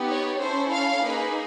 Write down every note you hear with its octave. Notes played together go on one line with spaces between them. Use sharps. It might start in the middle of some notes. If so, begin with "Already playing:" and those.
Already playing: B3 D#4 G4
C#5
C#4 E4 A4 C5
F5
A#3 D#4 G#4 B4